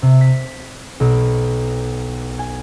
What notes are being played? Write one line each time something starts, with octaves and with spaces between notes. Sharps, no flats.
C3
B6
B1
G#5